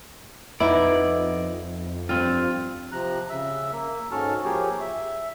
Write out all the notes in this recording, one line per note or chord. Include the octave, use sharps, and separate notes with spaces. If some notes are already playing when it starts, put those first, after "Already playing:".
F2 B3 D#4 E4 D5
G2 C4 F4
C3 F3 A#5 F#6
C#3 E5 E6
A#3
G#2 C#4 F#4 A4 A5 F6
F3 A#3 G4 G#4 C#5
E5